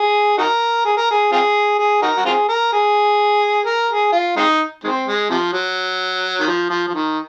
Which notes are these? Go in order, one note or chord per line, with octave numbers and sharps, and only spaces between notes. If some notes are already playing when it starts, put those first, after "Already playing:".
Already playing: G#4
D#4 F#4 A#4
G#4
A#4
G#4
C4 F4 G#4
G#4
D#4 F#4 A#4
F#4
C4 F4 G#4
A#4
G#4
A#4
G#4
F4
G#3 C4 D#4
D#3 G#3 C4
G#3
C3 F3
F#3
D#3
F3
F3
F3
D#3